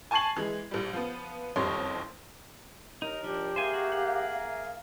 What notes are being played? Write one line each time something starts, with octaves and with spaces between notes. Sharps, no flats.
G#5 A5 C#6 G#6 C7 F#7
E3 G#3
A#1 G3
F3 B3
F#1 F2 D#3 G3 C#5 C6
D#2 D#4 A#4
F3 D4 G4
A#3 G#4 A#4 C5 E5 F5 G#5
F#4
F#5